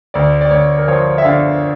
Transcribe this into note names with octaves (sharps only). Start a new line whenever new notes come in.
D2 D5
D5
D2 C#5
A#4
F3 C#5
E5
D3 F5